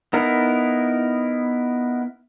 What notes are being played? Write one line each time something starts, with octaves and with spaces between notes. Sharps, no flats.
B3 D#4 E4 A#4